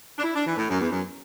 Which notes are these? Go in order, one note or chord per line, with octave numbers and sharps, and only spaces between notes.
D4
E4
D4
E3
A2
F#2
E2
F#2